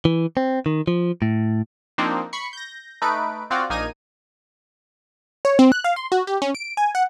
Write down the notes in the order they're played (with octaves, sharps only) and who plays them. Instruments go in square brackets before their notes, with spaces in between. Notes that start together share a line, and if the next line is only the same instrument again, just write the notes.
[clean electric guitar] E3
C4
D#3
F3
A2
[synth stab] F3 A#3 C4 D4 D#4
B5 C#6 C7 C#7
G6 A#6
A3 D#4 B4 D7
C4 F4 F#4 D5
A#1 A#3 D#4 G#5 A#5 D#7
[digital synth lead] C#5
C4
F#6
F5
C6
F#4
G4
C#4
D7
G#5
F#5